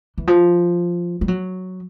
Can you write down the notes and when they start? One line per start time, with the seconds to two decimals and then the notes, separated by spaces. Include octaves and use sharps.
0.18 E3
0.27 F3
1.21 G3
1.28 F#3